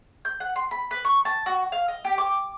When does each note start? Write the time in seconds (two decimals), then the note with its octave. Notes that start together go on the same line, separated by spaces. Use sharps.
0.25 G6
0.40 F#5
0.56 C6
0.71 B5
0.91 B4
1.05 C#6
1.25 A5
1.46 F#4
1.72 F5
1.88 D#5
2.05 G4
2.18 D6